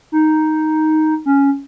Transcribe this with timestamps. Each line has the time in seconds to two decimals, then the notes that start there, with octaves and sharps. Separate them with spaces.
0.12 D#4
1.26 C#4